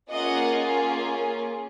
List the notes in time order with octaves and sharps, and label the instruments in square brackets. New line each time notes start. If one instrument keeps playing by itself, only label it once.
[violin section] A#3 C#4 F4 G#4 D#5 F#5